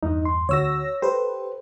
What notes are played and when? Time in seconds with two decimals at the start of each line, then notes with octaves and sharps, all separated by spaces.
0.03 E2 G2 D#4
0.25 C6
0.49 D2 F#4 C#5 E6 A#6
1.02 G4 A4 B4 C5